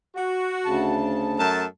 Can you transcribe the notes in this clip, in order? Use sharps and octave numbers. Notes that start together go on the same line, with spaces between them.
F#4
D2 C#3 A5
F#2 A3 A5